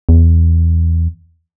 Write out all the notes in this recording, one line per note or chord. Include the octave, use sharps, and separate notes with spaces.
E2